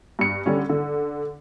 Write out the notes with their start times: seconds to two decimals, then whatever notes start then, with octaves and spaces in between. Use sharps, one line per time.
0.19 G2 C#7
0.46 D3 G3 C#4
0.69 D3